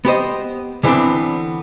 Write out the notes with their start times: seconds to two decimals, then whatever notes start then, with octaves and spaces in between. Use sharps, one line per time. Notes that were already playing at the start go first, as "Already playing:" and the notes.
0.05 B3 G4 C5 D#5
0.83 D3 E3 B3 C4 D4